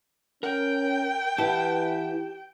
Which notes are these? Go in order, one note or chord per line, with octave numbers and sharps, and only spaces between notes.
C#4 A#4 G5
E3 E4 G4 B4 F#5 A5